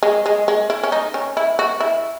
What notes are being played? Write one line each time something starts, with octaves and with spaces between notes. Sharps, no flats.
G#3
G#3
G#3
E4
C#4
D#4
C#4
E4
F#4
E4